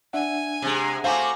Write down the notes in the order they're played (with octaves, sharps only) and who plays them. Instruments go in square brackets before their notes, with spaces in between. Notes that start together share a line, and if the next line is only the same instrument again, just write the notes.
[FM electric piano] D4 E5 F#5 [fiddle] G#5
[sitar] C3 G#3
[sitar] A3 C5 [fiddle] F#4 A#5 [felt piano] F5 G#5 D6